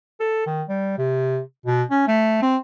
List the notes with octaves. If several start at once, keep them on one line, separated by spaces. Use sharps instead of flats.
A4
D#3
G3
C3
B2
C#4
A3
C4